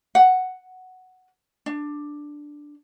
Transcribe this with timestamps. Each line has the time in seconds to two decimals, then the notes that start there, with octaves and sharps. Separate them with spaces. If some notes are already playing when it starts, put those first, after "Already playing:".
0.15 F#5
1.66 D4